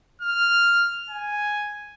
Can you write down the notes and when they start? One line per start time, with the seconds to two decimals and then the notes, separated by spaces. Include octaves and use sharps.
0.21 F6
1.10 G#5